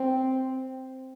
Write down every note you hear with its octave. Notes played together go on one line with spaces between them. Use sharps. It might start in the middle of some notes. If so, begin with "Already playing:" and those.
Already playing: C4